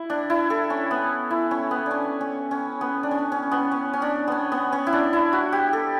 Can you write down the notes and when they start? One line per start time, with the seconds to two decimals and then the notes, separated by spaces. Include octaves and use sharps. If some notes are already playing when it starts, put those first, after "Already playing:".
Already playing: E4
0.10 D4
0.30 E4
0.50 A4
0.70 C#4
0.91 B3
1.30 E4
1.51 C#4
1.71 B3
1.86 C#4 D4
2.21 C#4
2.51 C#4
2.81 B3
3.03 D4
3.11 C#4
3.32 C#4
3.51 B3
3.71 C#4
3.93 C#4
4.02 D4
4.28 B3 C#4
4.52 B3
4.72 C#4
4.87 E4
4.93 D4
5.13 E4
5.33 F#4
5.52 G4
5.73 A4